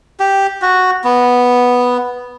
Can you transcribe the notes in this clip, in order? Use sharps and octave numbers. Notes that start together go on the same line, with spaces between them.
G4
F#4
B3